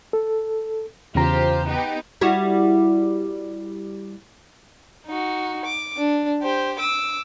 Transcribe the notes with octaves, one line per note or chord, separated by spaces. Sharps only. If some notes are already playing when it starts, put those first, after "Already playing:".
A4
E2 C#3 F4 G4 C5 A#5
B3 D#4 G4
G3 E4 F#4
D#4 F#4
D6
D4
G4 C5
D6 E6